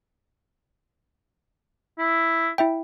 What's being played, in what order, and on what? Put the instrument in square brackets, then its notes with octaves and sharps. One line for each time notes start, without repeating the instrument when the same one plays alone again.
[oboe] E4
[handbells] E4 E5 G5